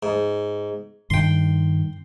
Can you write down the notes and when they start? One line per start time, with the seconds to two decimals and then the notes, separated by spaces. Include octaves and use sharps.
0.03 G#2
1.10 G2 D#3 G5 C6